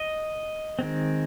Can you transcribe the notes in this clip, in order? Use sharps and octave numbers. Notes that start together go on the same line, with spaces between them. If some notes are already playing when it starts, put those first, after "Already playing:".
Already playing: D#5
D#3 G#3 C4